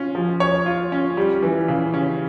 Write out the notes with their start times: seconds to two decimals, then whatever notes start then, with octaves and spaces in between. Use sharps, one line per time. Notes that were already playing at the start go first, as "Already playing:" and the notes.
Already playing: C#4 F4
0.15 F3
0.40 C#5
0.66 F4
0.92 C#4
1.17 G3
1.42 E3
1.68 C#3
1.94 C#4